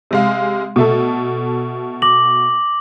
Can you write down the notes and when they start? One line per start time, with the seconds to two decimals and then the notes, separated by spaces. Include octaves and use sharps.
0.11 C3 G#3 F5
0.76 B2 A3 A4
2.02 D6 A#6 F#7